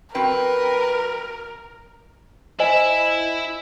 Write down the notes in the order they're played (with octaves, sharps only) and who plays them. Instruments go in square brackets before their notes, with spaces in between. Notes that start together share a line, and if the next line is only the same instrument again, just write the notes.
[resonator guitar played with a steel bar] F#3 C4 G5 [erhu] A#4 [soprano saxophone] B4
[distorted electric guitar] E4 E5 [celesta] C5 D#5 G#5